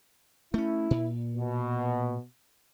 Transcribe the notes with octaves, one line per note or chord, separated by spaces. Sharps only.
A3 C#4 E4
A#2
B2